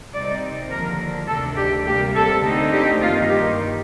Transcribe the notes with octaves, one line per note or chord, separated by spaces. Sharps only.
C3 G3 C4 D#4 D5
D#2 D3 F3 A#3 A#4
D2 C3 D#3 A3 D4 A4
G4
C3 G3 A#3 G4
A4
D3 A3 C4 D#4
G4
G2 D#3 A#3 D#4 F4
G4